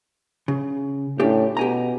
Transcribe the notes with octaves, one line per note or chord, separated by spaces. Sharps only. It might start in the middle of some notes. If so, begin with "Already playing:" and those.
C#3
A2 C#4 D4 G4
B2 G4 G#5 A#5